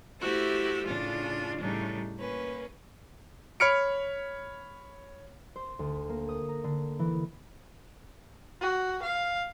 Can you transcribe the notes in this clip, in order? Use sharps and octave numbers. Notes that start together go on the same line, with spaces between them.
A3 E4 F#4 G4 C5 E6
A2 C#3 D4 F4
A2 C#3 G3 D4 D#4
A#3 C#4 B4
C#5 B5 F6 C#7 D7
C5
D2
A#3
D#6
A#5
D3
E3
F#4
F5